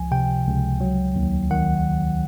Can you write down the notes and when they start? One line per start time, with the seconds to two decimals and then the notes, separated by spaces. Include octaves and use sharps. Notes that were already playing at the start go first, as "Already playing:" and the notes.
Already playing: C#2 F3 G#5
0.11 C3 G5
0.47 C#2
0.81 F#3
1.16 D#2
1.50 D#3 F#5